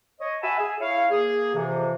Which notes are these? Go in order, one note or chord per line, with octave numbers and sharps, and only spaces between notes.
C#5 D#5
E5 F#5 G#5 A5 B5 E6
G#4
E4 C#5 F5
A#3 G#4
F2 C3 E3